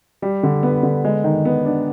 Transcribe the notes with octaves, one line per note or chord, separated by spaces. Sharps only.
G3
D3
B3
D3
G#3
D#3
B3
D4